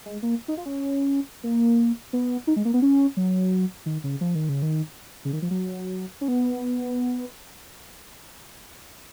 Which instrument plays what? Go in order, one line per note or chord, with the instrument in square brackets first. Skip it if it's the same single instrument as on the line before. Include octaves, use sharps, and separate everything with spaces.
[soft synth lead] G#3
A#3
D#4
F4
C#4
A#3
B3
D#4
G#3
A#3
B3
C#4
F#3
D#3
C#3
F3
D#3
C#3
D#3
C#3
D#3
F3
F#3
C#4
B3